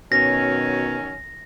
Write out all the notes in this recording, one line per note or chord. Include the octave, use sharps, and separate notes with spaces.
B2 D#3 F#3 C#4 A#6